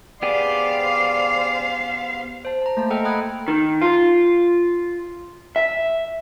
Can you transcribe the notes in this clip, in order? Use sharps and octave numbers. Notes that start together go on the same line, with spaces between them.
B3 G4 G#4 C5 D5 F5
C5 A5
A5 A#5
A3 A#3 A5
A4 D#5 F#5 G5 A#5 F6
F#5 G5 B5 D#6 F#6 G#6
D#3
F4
E5